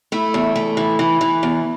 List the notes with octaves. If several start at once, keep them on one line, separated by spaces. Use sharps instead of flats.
A3 E4
E2
A3
E3
E3
E3
E2